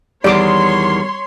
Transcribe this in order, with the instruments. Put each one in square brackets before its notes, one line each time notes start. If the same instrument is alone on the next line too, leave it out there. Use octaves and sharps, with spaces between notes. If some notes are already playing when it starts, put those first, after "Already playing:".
[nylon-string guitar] E2 D#3 [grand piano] G3 [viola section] C#5 C6 [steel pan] D5 D6